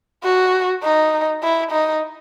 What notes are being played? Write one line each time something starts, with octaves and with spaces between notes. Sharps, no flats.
F#4
D#4
E4
D#4